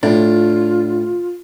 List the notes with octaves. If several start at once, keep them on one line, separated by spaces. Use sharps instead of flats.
A2 D4 F4